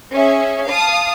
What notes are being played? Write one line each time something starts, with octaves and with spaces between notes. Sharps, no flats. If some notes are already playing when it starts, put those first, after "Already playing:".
C#4 G#4 E5
F5 A5 D#6